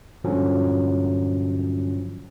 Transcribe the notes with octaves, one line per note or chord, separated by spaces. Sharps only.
G2 A#2 D3 F3 F#3 C#4